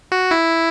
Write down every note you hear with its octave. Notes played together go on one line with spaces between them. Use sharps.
F#4
E4